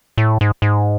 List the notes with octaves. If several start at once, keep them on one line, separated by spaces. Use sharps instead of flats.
A2
G#2
G#2